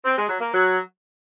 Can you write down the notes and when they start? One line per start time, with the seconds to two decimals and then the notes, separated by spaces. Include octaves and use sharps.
0.05 C4
0.17 G#3
0.29 F#3
0.40 A#3
0.52 F#3